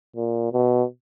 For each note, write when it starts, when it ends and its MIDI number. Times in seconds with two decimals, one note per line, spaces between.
0.16 0.52 46
0.53 0.84 47